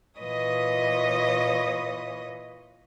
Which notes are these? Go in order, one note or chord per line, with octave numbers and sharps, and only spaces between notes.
A#2 E3 B4 C#5 D#5 D#6